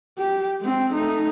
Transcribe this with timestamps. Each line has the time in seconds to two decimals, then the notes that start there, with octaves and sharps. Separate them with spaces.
0.18 G4
0.60 G#3 C4
0.93 A3 D#4